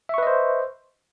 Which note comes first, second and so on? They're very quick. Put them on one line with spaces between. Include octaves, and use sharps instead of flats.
E5 C#6 B4 D#5 C5